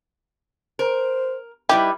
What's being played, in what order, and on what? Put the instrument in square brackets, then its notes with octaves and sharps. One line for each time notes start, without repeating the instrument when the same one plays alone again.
[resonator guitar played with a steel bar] A#4 [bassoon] C5
[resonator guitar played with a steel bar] G3 E4 B4 [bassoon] D#4 [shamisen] G4